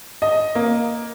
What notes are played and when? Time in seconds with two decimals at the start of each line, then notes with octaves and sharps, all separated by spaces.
0.22 D#5
0.55 A#3